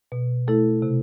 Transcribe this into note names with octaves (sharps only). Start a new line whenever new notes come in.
B2
A3 E4 A4
C3